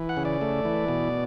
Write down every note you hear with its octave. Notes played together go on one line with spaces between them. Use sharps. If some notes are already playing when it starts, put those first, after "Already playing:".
Already playing: E3
F#5
C#3
D5
A3
E3
B2